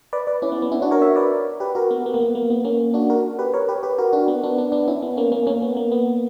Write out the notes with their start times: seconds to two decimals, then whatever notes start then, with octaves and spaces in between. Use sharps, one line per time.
0.13 B4 D5
0.27 B4 D5
0.42 C#4 E4
0.52 B3
0.62 B3
0.72 C#4 E4
0.82 D4 F#4
0.91 A#4 C#5
1.02 C#5 E5
1.16 B4 D5
1.60 G4 B4
1.75 F#4 A#4
1.91 B3
2.06 B3
2.14 A#3
2.20 B3
2.35 A#3
2.50 B3
2.65 A#3 C#4
2.94 D4 F#4
3.10 F#4 A#4
3.39 G4 B4
3.54 A#4 C#5
3.68 G4 B4
3.83 G4 B4
3.98 F#4 A#4
4.13 D4 F#4
4.28 B3
4.43 B3 D4
4.58 B3 D4
4.72 B3 D4
4.87 C#4 E4
5.02 B3
5.17 A#3 C#4
5.32 A#3 C#4
5.47 A#3 C#4
5.62 B3
5.77 A#3
5.92 B3